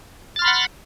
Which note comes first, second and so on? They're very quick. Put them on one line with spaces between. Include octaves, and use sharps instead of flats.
A6 F6 C6 B5 F#5